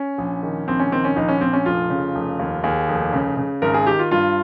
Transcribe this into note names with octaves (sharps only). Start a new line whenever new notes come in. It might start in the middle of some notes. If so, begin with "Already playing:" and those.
Already playing: C#4
A#1
D#3
A#1 C4
C#4
D#3 C4
C#4
A#1 D#4
C#4
A#1 C4
C#4
F1 F4
C#3
F1
D#2
D#2 G#4
F1
C#3
C#3
G#1 A#4
G#4
D#3 G4
F4
G2 F4